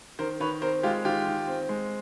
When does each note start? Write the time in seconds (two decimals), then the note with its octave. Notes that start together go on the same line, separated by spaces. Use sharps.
0.19 D#3 A#4 C5
0.40 D#3 B4 C#5
0.61 C4 A#4 C5
0.83 G#3 F4 G4
1.04 D#3 F4 G4
1.26 D#3
1.48 C4
1.69 G#3